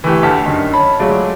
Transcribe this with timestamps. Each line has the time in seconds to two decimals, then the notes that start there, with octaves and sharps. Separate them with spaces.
0.04 E3 A3 G4
0.23 D2 D3 A5 F6 B6
0.45 F#2 D3 D#3
0.73 C#5 A5 B5
0.99 F#3 G#3 A3 F4 D5